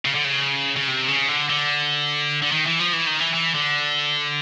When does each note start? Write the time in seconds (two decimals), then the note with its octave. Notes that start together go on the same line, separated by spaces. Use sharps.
0.05 C#3
0.15 D3
0.24 C#3
0.76 C#3
0.88 C3
1.08 C#3
1.28 D3
1.50 D3
2.42 D3
2.52 D#3
2.66 E3
2.79 F3
2.93 E3
3.07 D#3
3.20 E3
3.34 E3
3.55 D3